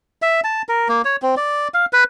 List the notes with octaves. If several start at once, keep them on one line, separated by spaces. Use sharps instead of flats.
E5
A5
A#4
A#3
C#5
C4
D5
F5
B4